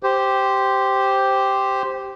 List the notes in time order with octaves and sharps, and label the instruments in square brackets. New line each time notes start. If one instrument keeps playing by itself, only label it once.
[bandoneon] G4 C5